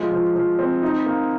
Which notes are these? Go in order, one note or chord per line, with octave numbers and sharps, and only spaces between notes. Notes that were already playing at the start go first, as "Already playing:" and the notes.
Already playing: F3 G#3
F3
F3
C4
D#4
A#3